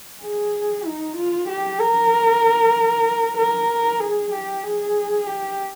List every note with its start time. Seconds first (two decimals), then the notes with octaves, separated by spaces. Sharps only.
0.22 G#4
0.86 D#4
1.16 F4
1.48 G4
1.81 A#4
3.37 A#4
4.00 G#4
4.32 G4
4.64 G#4
5.27 G4